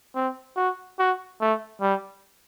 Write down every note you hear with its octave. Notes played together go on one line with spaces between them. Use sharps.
C4
F#4
F#4
A3
G3